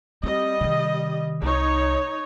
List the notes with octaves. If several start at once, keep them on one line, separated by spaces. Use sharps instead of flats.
G3 C4 D#5
C3 D#3
C2 D#4 C#5